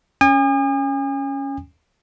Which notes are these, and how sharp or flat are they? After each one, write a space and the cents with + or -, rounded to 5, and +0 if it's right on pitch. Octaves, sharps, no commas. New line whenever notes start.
C#4 +0 G#5 -40 D#6 -40